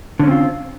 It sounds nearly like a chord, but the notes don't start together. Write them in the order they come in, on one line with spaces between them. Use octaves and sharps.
D3 C#4 C4 F4